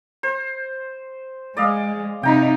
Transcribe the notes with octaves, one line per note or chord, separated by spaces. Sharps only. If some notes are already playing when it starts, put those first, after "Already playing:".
C5
G#3 D5 D#5 F5
C3 D#4 G5 A#5 B5